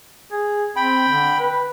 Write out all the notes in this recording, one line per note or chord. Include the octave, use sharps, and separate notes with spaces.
G#4
C4 G5 B5
D3
B4